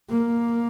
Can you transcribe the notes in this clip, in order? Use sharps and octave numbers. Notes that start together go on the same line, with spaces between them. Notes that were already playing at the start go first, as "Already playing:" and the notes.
A#3